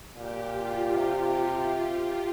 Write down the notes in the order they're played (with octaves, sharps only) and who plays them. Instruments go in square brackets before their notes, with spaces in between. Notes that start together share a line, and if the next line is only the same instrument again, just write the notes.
[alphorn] A#2 [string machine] G4
[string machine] F4
[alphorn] C3 [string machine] G4